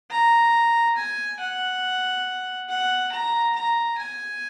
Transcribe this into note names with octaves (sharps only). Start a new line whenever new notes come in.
A#5
G#5
F#5
F#5
A#5
A#5
G#5